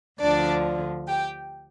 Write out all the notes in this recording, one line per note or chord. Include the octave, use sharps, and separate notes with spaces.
D2 D3 F3 D4 D5
G4 G5